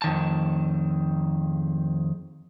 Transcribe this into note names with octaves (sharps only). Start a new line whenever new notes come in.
F2 D#3 A5